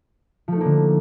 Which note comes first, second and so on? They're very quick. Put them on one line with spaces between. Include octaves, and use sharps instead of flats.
F3 A3 D#4 A#3 D3